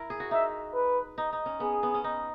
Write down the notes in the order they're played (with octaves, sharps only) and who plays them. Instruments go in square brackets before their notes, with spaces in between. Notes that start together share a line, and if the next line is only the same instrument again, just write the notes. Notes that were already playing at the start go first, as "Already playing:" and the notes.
Already playing: [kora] E4 A#4
G#4
F#4
[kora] D#4 [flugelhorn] E5
[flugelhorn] B4
[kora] D#4
D#4
C#4
[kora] B3 [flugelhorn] G#4
[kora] B3
C#4
D#4